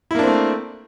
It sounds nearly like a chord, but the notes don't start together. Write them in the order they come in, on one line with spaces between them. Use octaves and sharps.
E4 A#3 D4 C4 A3